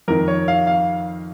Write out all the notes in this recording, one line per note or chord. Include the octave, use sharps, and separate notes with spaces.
F2 D#3 A#4
C#5
F5
F5